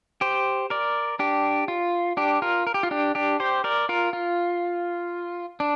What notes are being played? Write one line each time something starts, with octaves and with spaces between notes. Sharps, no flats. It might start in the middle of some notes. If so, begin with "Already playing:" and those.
G4 C5
A#4 D5
D4 G4
F4
D4 G4
F4 A#4
A#4
G4
F4
D4 G4
D4 G4
G4 C5
A#4 D5
F4 A#4
F4
D4